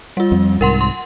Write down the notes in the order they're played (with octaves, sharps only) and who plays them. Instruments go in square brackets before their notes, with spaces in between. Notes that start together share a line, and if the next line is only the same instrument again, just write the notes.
[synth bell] G3 F4
[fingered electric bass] F2
[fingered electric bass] C2 G#2 [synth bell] A#4 F#5 C6
[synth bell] C6